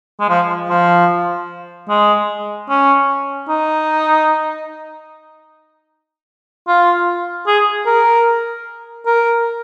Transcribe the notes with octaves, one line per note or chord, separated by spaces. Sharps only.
G#3
F3
F3
G#3
C#4
D#4
F4
G#4
A#4
A#4